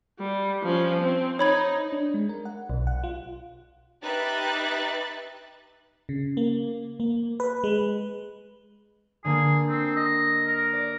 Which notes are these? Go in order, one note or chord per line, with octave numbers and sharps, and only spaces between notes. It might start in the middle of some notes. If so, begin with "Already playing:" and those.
G3
F3 C#4
C4
D#4 C#5 B5 G#6
D4
G#3
A#4
F#5
B1
F#5
F4
D#4 G4 B4 E5 F#6 A6
C#3
A#3
A#3
B4
G#3
D3 A#3 G#4
C4
D#5
A#4
D5